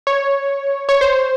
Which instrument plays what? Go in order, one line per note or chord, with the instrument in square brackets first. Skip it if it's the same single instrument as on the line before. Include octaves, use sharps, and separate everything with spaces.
[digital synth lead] C#5
C#5
C5